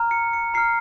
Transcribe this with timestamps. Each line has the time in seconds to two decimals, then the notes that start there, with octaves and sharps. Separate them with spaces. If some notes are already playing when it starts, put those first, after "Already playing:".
Already playing: A#5 F6
0.11 C#7
0.33 C#7
0.54 A#5 F6 C7